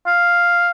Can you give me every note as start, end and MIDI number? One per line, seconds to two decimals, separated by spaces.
0.06 0.70 77